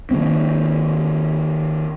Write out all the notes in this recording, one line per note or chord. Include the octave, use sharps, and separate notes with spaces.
D#3 E3 A#3 C4